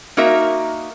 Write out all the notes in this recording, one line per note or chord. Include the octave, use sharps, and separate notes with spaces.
A#3 D#4 F#4 A#4 E5